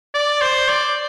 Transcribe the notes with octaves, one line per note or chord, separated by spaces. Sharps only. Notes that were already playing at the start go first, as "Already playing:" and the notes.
D5
C5
D5